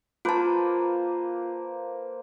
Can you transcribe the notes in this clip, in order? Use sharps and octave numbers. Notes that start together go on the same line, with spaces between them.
A#3 F4 B4 C5 A5